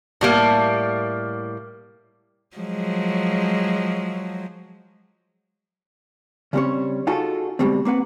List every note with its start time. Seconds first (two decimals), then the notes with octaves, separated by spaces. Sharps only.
0.21 A2 G3 A#3
2.57 F3 F#3 G#3
6.53 C#3 G3 C4 C#4 C5 C#5
7.07 D#4 F4 F#4 G#4 A4
7.59 D2 G#2 B2 G3 G#3 C4
7.85 A#3 C4 B4 F#5